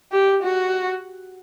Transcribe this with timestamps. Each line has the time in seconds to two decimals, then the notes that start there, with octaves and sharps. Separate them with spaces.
0.12 G4
0.43 F#4